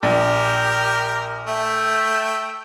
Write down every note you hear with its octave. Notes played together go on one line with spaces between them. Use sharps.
A#1 G4 A#4
A3 E5 G5